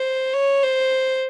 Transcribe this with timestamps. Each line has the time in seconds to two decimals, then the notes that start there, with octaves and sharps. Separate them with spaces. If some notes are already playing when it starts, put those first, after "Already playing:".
Already playing: C5
0.34 C#5
0.63 C5